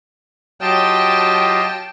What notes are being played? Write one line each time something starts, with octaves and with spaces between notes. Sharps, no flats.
F#3 F4 G4 D#5 G5 A5